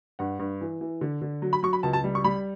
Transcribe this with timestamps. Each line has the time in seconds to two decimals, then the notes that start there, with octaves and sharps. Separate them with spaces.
0.19 G2 F#5
0.39 G2
0.61 E3
0.81 E3
1.01 D3
1.22 D3
1.42 F#3
1.53 B5
1.63 F#3 C#6
1.73 B5
1.83 C#2 A5
1.93 A5
2.04 G3
2.15 C#6
2.24 G3 B5